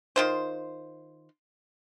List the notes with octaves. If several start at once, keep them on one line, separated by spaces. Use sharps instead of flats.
D#3 F4 C5